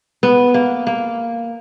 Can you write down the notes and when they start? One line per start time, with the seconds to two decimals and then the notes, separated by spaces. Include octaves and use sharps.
0.23 B3
0.54 A#3
0.87 A#3